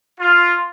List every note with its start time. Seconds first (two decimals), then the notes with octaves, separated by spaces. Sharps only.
0.20 F4